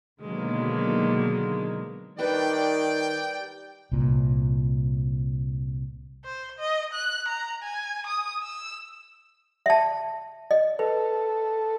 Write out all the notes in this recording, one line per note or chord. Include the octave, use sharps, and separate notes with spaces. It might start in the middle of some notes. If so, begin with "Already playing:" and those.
B2 D3 D#3 F#3 G#3 A#3
D#3 G3 D4 B4 D5 G5
C2 A#2
C5
D#5
F#6
A#5
G#5
D#6
E6
E5 A5
D#5
A4 B4